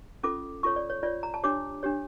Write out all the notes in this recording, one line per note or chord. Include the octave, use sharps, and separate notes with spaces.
C#4 F4 A4 D6
F4 A4 C#5 C#6
D5
C#5
F4 C#5 D5
A#5
A5
D4 G4 C#5 D6
D4 G4 C#5